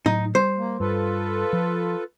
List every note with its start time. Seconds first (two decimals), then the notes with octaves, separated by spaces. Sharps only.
0.06 A2 F#3 D#4
0.35 G3 C5
0.57 A#3
0.80 G2 F4 A4 B4
1.53 F3